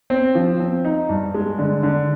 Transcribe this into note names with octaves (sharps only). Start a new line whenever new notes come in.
C4
F3
C4
D#4
G2
G#3
D3
D3